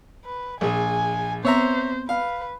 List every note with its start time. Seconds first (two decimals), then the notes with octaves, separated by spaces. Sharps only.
0.25 B4
0.61 A#1 G#4 G#5
1.45 B3 C4 C5 C#5 E5 A#5
2.09 B4 F5